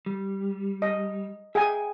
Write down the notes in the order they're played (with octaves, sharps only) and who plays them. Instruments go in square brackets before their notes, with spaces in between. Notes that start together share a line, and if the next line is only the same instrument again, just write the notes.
[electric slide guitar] G3
[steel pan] D#5
[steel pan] G#4 G#5 [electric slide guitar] E5 G5